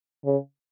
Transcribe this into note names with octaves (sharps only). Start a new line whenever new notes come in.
C#3